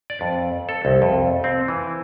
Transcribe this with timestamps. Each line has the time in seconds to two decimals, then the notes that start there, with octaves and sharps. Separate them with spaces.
0.10 D5
0.21 F2
0.69 A4
0.85 C2
1.02 F2
1.44 C4
1.68 E3